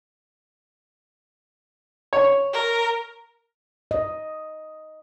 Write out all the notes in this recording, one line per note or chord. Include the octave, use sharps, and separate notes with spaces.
C#5
A#4
D#5